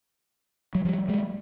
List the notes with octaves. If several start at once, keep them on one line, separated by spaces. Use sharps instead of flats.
F#3
F3 G3
F#3 G#3